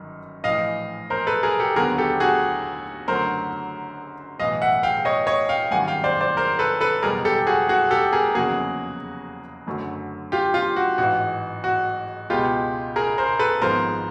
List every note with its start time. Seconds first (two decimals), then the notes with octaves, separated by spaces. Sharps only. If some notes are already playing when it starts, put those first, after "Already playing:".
Already playing: G1 F#2 D#3
0.44 A#1 A2 E3 D#5 F5
1.10 A#4 C5
1.27 A4 B4
1.43 G#4 A#4
1.60 G4 A4
1.76 D#2 D3 F#3 B3 G#4 A#4
1.98 G4 A4
2.20 F#4 G#4
3.08 F#1 F#2 D3 F#3 A3 A#4 C5
4.39 B1 A2 E3 D#5 F5
4.62 E5 F#5
4.83 F5 G5
5.05 C#5 D#5
5.27 C#5 D#5
5.49 F5 G5
5.71 G#1 F#2 D#3 G3 F#5 G#5
5.88 F5 G5
6.04 C5 D5
6.21 C5 D5
6.37 A#4 C5
6.59 A4 B4
6.81 A4 B4
7.03 F#1 E2 B2 G3 B3 G#4 A#4
7.25 G4 A4
7.47 F#4 G#4
7.69 F#4 G#4
7.91 G4 A4
8.13 G#4 A#4
8.34 F1 E2 C#3 F#3 A#3 F#4 G#4
9.67 F#1 F#2 D3 F#3 A3
10.32 F4 G4
10.54 F4 G4
10.76 F#4
10.98 A1 G#2 E3 F#4
11.64 F#4
12.30 C#2 B2 G#3 B3 F4 G4
12.96 G#4 A#4
13.18 A#4 C5
13.39 A4 B4
13.62 G#1 G#2 F3 G#3 B3 A#4 C5